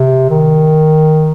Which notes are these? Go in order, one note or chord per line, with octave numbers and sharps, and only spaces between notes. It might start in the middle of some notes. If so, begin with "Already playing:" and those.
Already playing: C3
D#3